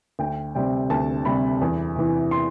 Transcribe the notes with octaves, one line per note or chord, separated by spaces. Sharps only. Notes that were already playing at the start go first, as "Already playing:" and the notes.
D2 G5
C3 G3 C4 G5
D2 A5
C3 G3 C4 B5
E2
C3 E3
C6